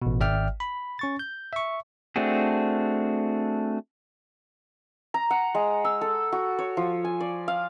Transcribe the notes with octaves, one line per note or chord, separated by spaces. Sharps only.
A1 B2
G#1 D5 E5 G5 F6
B5
C#4 C#6 A6
G6
E5 C#6
A3 C4 D4 F#4 G#4
A#5
F#5
G#3
E6
A4
F#4
C#5
F3
G#5
D5
F5